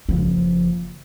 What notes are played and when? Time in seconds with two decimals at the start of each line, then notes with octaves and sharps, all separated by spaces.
0.09 F#1 F3